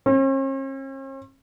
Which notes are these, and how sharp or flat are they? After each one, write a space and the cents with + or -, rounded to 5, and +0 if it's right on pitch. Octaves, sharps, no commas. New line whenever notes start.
C#4 -45